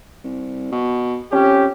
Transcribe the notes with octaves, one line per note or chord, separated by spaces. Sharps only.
C2
B2
F2 C#4 G4